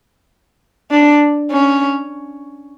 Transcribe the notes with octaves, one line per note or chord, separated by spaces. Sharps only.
D4
C#4